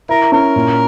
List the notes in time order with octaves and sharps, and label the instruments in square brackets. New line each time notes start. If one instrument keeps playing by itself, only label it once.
[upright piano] E4 [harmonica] A#4
[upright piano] C#4 [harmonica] A#4
[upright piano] A#2